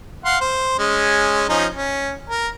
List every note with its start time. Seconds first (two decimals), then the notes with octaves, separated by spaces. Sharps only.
0.25 F5 F#5 C6
0.41 C5
0.79 G#3 C#4
1.49 F3 C#4 D#4
1.76 C#4
2.30 A#4